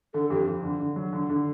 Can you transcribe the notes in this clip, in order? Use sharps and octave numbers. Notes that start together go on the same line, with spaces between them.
D3 A4
F2 G4
F2
D3
D3
F#3
D3
D3